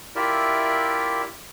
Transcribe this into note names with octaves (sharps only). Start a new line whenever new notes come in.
E4 F4 G4 A#4 D5 E5